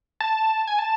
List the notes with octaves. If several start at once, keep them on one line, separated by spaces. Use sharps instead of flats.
A5
G#5
A5